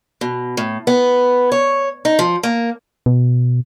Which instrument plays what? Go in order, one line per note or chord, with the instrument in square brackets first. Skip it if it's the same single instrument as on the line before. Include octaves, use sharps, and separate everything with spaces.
[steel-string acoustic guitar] B2
A2
B3
C#5
D#4
F3
A#3
[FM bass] B2